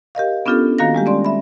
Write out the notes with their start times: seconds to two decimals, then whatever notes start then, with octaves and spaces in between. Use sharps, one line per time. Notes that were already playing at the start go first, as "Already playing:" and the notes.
0.15 G4 A#4 D#5 F5
0.46 B3 C#4 D4 F4 G4 A4
0.78 D#3 A#3 F#4 F5 A#6
0.95 G3 G#3 G4
1.06 C#4 D5 C6
1.25 E5 B5